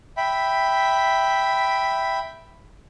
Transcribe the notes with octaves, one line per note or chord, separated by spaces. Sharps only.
E5 G5 B5